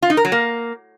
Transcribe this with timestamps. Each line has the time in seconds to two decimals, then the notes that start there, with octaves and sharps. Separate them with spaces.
0.02 F4
0.10 D#4
0.17 A#4
0.25 F#3
0.32 A#3